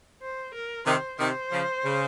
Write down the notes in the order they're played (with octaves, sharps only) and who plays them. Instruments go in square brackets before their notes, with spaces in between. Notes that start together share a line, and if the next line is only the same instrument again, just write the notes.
[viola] C5
A#4
[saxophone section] C3 D#3 [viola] C5
[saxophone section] C3 D#3 [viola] C5
[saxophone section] C#3 F3
C#3